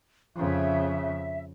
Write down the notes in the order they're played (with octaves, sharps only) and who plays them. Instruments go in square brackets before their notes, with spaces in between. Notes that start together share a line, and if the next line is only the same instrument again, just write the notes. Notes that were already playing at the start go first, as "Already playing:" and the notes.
[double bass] F2 C#3 [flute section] E5